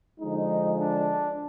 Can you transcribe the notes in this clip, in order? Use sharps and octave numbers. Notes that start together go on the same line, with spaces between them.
D3 F3 G#3 D#4
D4